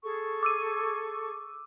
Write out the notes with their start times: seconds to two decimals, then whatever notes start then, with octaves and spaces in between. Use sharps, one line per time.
0.03 G#4 A4 C#6
0.43 D6 E6 D#7